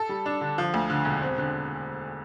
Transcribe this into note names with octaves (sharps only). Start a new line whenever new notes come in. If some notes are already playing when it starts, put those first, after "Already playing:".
Already playing: A4
G3
D4
D3
F3
D2
D3
E1
C4
D3